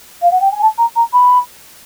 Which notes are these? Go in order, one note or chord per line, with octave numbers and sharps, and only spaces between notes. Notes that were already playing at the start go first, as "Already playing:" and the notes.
F5
F#5
G5
G#5
A5
A#5
A#5
B5